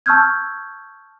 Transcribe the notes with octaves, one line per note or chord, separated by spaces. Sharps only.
A5 C#6 E6 F6 G6 G#6